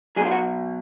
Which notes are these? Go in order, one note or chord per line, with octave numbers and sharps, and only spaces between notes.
B2 F#3 F4 G#4
F#4